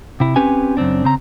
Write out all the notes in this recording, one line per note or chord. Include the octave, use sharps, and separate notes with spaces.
C3 E4
C4 C#4 G4 B4 G#5
F#2 C#3 C4 D4
C#3 C4 A#5